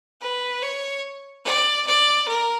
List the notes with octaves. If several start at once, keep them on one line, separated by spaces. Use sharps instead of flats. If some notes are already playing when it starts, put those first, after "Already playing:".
B4
C#5
D5
D5
A#4